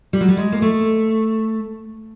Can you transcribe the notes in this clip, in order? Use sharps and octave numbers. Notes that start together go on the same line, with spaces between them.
G3
F#3
G3
G#3
A#3
A3